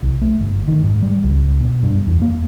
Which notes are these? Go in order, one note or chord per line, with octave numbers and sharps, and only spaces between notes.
C2
A3
G1
D#3
G#2
G3
C#2
B2
G2
E2
A#3